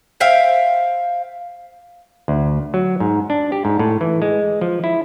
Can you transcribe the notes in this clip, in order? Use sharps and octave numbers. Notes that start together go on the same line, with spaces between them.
C5 E5 F5 G5
D2
F#3
G#2
D4
G4
G#2
A2
E3
G#3
F3
E4